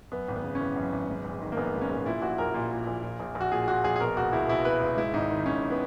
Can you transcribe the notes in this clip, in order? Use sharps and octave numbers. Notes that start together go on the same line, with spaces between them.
F#2 B3
G#1
B3
C#3
C#4
E3 B3
F#2
G#1
G#2
A#1
D#3
A#3
A#1 B3
G#2
C#4
A#1
A#2 E4
A#1 F#4
A#1 A#4
A#2
A#2
A#1
A#2
A#1
A#1
F#4
A#2 G#4
A#2 F#4
A#1 G#4
G#4
B2 A#4
C#2 F#4
C#2 E4
B2 E4
B2 B4
C#2
G#2 E4
G#1 D#4
D#3
G#1 C#4
B3